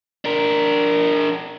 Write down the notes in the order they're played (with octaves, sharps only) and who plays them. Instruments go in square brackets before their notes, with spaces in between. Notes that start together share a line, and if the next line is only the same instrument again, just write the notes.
[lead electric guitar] D4 A#4